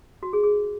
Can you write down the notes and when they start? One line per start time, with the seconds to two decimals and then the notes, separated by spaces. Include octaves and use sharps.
0.23 F#4
0.33 G#4
0.43 G#4